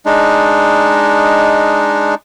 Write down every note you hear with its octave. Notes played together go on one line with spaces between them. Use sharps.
G#3 D4 D#4